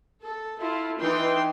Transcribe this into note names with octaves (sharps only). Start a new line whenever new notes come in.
A4
E4 F4 A4
E3 D#4 G5 C6